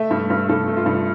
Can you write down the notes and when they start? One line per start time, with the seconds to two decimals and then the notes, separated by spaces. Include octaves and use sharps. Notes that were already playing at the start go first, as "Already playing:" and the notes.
Already playing: A3 E5
0.11 G2
0.30 G2
0.49 G2 A4
0.67 A3
0.77 F4
0.86 G2